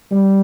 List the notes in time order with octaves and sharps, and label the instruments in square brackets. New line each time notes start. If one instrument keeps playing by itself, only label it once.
[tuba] G3